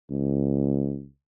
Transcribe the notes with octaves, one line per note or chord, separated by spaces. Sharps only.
C#2